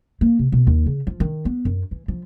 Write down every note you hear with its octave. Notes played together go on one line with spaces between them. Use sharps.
A#3
C3
B2
D#2
C#3
F3
D#3
B3
F#2
E3
F3